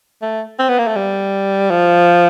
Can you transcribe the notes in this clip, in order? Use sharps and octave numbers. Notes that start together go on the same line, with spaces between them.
A3
C4
B3
A#3
A3
G3
F3